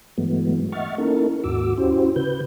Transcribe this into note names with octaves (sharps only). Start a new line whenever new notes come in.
G2 E3 F#3 G#3 A3 B3
D#5 E5 F#5 C#6 F6 A6
A#3 C#4 D#4 E4 A4 A#4
D#2 G#2 F#4 D6 E6
C#4 E4 F#4 G4 C5
C#3 B4 G6